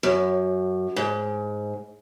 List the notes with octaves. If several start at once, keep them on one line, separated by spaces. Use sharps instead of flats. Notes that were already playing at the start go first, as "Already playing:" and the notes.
F#2
G#2